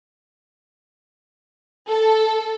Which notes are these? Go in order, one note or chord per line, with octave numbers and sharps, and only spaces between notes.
A4